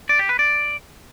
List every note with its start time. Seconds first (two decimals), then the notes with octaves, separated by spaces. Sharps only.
0.09 D5
0.19 G4
0.29 B4
0.39 D5